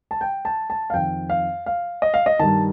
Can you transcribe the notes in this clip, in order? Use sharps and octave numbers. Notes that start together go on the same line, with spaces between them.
A5
G5
A5
A5
F5
F2 D#3 G5
F5
F5
D#5
F5
D#5
G2 D#3 A5